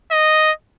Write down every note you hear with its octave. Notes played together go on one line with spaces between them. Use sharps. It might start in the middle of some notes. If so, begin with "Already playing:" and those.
D#5